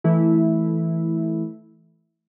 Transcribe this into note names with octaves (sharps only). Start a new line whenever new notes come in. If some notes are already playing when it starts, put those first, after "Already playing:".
E3 A3 E4